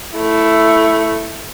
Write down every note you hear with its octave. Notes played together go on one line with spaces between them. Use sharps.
A3 E4